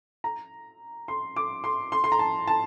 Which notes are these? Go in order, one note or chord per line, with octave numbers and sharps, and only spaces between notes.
A#5
C6
D6
C6
C6
C6
A#5
A5
A5